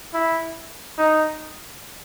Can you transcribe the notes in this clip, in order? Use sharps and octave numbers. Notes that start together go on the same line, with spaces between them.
E4
D#4